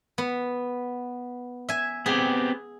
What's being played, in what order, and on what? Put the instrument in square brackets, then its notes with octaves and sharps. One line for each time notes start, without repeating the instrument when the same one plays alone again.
[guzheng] B3
E5 G#5
[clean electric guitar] B3 C4 G4 [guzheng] G#4